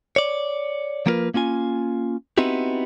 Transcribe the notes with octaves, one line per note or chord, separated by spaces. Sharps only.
C#5 D5
F3 A#3 B3 F4 A#4 B4
A#3 C#4 F4 G#5
B3 C4 D#4 E4 F#4 G4